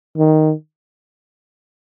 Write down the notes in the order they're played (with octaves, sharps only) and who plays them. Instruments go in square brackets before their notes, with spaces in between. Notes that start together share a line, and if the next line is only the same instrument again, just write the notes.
[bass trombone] D#3